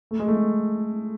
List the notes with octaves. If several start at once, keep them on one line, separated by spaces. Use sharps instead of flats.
A3
G#3
A3